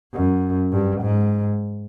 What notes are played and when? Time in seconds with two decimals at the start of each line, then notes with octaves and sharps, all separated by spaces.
0.13 F#2
0.72 G2
1.02 G#2